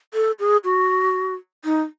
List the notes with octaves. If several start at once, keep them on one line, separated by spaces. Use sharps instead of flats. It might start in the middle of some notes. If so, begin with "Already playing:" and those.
A4
G#4
F#4
D#4